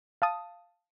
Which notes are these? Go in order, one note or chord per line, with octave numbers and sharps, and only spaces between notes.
F5 A5 D#6